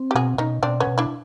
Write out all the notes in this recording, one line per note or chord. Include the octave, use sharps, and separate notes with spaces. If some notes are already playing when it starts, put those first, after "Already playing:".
Already playing: C4
G4
B2 F#4 G#4
B2 C#4 D#4
B2 C4 D4
B3 C#4
B2
D4 E4